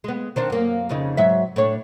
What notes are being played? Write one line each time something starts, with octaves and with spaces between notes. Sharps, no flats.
G#3 B3
D#3 C4 D4
F#2 A#3
F2 C#3 D#4
G#2 F#3 E5
A2 D4 C#5